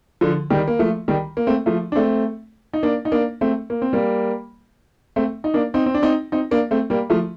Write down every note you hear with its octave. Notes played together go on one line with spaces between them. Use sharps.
D3 F3
D#3 G3
A#3
F3 A3
D#3 G3
A#3
A3 C4
F3 A3
D4
A3 C4
D#4
A#3 D4
D#4
A#3 D4
A3 C4
A#3
C4
G3 A#3
A3 C4
D#4
A#3 D4
C4 D#4
C4
D4
C4 D#4
C4 D#4
A#3 D4
A3 C4
G3 A#3
F3 A3